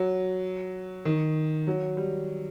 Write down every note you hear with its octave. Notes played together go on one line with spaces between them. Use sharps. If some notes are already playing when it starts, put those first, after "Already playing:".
Already playing: F#3
D#3
F#3
G3